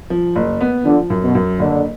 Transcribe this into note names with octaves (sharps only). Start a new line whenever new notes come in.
F3
F#1
B3
D3 F3
F#2
B2
F#2
F#1 D3